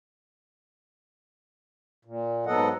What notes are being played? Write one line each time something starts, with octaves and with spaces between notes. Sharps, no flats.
A#2
G#2 F#3 B3 A4 D#5 F#5